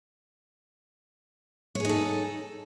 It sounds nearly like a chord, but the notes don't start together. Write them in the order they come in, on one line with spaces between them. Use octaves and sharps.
C#5 G#4 D#4 A4